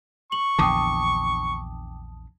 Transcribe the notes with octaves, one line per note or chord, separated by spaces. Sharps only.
C#6 F#7
A#1 E2 D3 G5 A5 D6 D#6